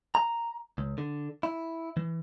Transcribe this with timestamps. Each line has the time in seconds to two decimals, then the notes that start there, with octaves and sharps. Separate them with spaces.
0.15 A#5
0.78 C#2
0.98 D3
1.43 E4
1.97 E3